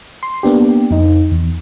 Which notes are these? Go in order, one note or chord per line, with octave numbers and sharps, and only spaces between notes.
C6
A#3 B3 D4 G4
F2 D#4
E2